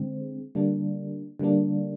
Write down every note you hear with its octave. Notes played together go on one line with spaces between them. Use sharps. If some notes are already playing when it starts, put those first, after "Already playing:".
Already playing: D3 G#3 C4
D3 G3 A#3 D4
D3 G3 A#3 D4